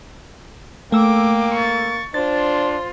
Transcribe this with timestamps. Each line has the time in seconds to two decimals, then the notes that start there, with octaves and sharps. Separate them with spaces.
0.92 A3 A#3 G5 D6 E6
1.54 C#6 A6
2.14 D4 F4 C5 A6